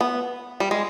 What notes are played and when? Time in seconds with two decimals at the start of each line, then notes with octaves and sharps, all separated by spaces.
0.01 B3
0.60 G3
0.71 G#3